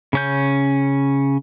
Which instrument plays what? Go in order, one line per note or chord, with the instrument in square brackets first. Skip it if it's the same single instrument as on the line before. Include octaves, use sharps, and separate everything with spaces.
[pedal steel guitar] C#3 C#4 G6